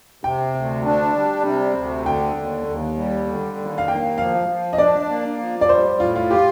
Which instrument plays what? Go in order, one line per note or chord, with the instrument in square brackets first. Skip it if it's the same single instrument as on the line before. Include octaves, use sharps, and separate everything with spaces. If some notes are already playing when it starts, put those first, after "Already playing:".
[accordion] C3 [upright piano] G5
[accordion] D2
D4
G3
C3
D2
[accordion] D3 [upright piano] G5
[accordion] D#2
D#2
G3
D3
D#2
[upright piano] F5
[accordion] A#3 [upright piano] G5
[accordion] F3 [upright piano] F5
[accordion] F3
[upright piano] D#5
[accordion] D4 [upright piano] D5
[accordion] A#3
F3
[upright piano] D5
[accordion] G3 [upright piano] C5
[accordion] A2 [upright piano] F4
[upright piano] F4
[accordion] F4 [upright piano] G4